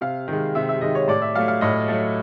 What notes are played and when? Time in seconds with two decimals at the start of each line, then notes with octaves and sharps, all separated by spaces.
0.01 C3 F5
0.28 D#3 G#3
0.55 C3 E5
0.69 E5
0.81 D#3 G#3 D#5
0.95 C#5
1.08 A2 D5
1.22 E5
1.35 F#3 A3 F5
1.48 F5
1.61 A2 D#5
1.88 F#3 A3